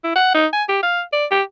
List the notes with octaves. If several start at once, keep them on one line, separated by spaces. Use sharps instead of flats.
E4
F#5
D#4
G#5
G4
F5
D5
G4